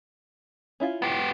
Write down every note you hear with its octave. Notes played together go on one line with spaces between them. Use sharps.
C#4 E4 F4
B3 G4